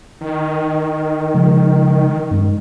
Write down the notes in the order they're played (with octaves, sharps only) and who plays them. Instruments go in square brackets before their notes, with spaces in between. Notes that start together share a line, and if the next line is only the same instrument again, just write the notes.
[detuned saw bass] D#3
[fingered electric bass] C#3 F3 G#3
G2 G#3 C#4